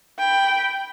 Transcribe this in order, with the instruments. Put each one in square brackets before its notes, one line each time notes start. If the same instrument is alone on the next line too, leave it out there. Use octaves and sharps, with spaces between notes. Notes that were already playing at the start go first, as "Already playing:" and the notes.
[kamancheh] G5 B5